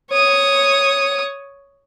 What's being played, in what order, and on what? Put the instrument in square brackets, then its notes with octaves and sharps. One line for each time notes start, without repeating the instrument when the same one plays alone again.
[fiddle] C#5 D#6